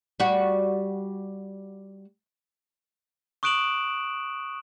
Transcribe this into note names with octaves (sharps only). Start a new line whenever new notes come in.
G3 F#4
C#6 D#6 F#6 D7 E7 F#7